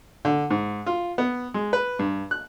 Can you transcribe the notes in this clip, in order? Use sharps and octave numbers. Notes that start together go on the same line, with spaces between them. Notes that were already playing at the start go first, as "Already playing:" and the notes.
D3
G#2
F4
B3
G#3
B4
G2
F#6